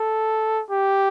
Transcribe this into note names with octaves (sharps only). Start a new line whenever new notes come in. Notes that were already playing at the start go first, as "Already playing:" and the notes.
Already playing: A4
G4